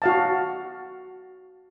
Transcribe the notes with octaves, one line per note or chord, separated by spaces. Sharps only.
F#4 F5 A5